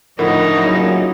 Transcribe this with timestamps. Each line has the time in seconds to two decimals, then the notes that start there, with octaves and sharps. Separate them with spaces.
0.19 A2 D3 D#3 F3 D#4 E4 A#4 F#5
0.58 A#2 C#3 F#3 E4